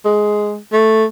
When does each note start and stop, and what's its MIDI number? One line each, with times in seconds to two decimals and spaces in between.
0.05 0.57 56
0.72 1.05 57